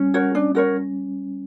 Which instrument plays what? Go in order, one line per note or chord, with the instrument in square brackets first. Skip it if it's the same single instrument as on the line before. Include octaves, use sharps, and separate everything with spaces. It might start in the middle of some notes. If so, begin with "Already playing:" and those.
Already playing: [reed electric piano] G3 C#4
[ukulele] F#4 A#4 C#5
D4
F#4 A#4 C#5